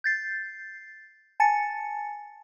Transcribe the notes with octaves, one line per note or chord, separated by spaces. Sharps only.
G6 A6 C7
G#5 A5 A6 C#7